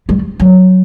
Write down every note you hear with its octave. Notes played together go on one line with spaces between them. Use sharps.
G3
F#3